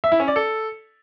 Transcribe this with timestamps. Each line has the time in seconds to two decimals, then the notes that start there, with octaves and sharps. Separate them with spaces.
0.04 E5
0.12 E4
0.20 C#4
0.28 D5
0.36 A4